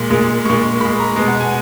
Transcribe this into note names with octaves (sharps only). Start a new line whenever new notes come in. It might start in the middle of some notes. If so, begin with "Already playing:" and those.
Already playing: A#2 G#3
A#2 G#3
A#2 G#3 C#6
A#2 G#3 B5
A#5
B2 G#3
F#5
G#5